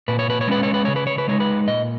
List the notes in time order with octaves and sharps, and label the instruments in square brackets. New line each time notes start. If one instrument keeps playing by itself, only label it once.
[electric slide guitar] A#2 B4
C#5
B4
C#5
G#3 C#4 B4
C#5
B4
C#3 C#5
B4
C#5
B4
G#3 D#4 C#5
B4
A#2 D#5